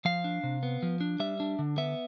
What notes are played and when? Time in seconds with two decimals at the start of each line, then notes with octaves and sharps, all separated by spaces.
0.05 F3 F5
0.24 D4
0.43 C3
0.63 B3
0.83 F3
1.01 D4
1.20 G3 E5
1.40 D4
1.59 D3
1.78 B3 E5